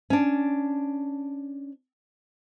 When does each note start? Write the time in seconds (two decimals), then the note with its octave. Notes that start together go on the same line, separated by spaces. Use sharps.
0.10 C#4 D4